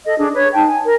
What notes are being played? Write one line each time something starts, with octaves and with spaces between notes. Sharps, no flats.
A4 D#5
D4 G#4
B4 C#5
D#4 G5 A5
G#5
A#4